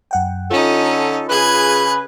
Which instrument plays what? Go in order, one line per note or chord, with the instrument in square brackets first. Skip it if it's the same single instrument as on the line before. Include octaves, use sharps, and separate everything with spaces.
[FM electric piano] F#2 F#5 G5
[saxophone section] D3 A4 [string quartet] C#4 D#4 [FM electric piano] F4
[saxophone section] C#3 B4 [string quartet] G#4 F#6 G#6 [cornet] B5